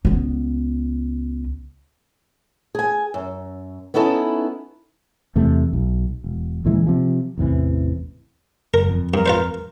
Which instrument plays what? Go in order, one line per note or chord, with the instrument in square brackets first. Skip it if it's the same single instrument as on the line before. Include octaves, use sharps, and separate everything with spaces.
[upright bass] C#2 B3
[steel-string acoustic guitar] G#4 G#5
F#2
B3 C#4 D#4 E4 A4
[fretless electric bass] E2 C3 A3
B1
E1
C#2 A#2 E3 G#3
C3 F3
A1 E2 C3 E3
[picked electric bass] F#1 [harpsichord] A#4
[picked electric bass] F2
[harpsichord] G2 [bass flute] A#4
[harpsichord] F4 B4 C5